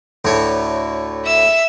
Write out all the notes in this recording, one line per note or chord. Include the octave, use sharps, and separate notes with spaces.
D2 A2 C#5
E5 E6